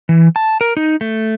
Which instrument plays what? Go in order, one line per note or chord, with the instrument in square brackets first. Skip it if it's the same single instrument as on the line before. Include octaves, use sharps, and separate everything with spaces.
[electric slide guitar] E3
A5
A#4
D#4
A3